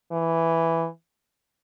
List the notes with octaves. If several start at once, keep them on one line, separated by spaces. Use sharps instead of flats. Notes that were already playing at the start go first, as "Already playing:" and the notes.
E3